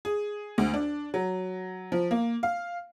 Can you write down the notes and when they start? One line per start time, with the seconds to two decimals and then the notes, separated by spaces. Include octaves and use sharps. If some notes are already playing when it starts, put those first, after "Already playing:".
0.05 G#4
0.58 D2
0.74 D4
1.14 F#3
1.92 F3
2.11 A#3
2.43 F5